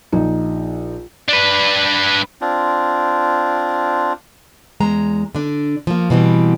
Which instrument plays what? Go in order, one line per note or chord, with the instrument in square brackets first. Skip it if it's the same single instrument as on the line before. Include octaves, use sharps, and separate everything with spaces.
[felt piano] A#1 D#4
[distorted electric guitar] D4 B4
[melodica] C4 D4 F4
[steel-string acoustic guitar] E2 G#3 A#5
D3 D4
F3 A#3
B2 E3 G3 C4